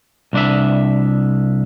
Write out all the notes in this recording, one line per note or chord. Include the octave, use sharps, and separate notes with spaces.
C2 D4 E5